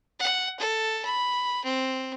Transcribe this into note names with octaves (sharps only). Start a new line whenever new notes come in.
F#5
A4
B5
C4